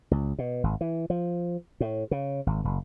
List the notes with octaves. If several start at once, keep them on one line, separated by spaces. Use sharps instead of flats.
C#2
B2
G#1
E3
F3
A2
C#3
G#1
F#1